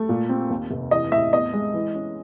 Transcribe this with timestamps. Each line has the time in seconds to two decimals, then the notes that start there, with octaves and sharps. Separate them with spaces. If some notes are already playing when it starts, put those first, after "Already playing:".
Already playing: A3
0.09 A#2
0.29 C4
0.50 D#2
0.71 F1
0.91 E3 D#5
1.12 A2 E5
1.33 E2 D#5
1.53 G#3
1.74 E3
1.95 C#4